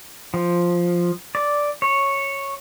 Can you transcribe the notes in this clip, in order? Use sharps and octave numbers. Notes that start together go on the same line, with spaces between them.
F3
D5
C#5